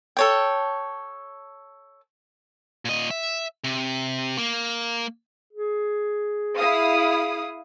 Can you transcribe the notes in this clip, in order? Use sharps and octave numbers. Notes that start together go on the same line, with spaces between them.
A4 C#5 G5
A#2 D#5
E5
C3
A#3
G#4
E4 F5 D#6